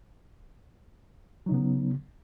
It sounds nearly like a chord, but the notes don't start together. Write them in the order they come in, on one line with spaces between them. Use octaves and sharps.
F#3 D#4 C#3 B3